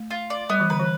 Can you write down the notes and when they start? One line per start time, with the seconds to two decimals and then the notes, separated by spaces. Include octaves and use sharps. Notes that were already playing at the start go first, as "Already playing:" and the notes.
Already playing: A3
0.10 F4
0.30 D5
0.49 G3 B3
0.60 E3
0.70 D3 B4
0.79 E3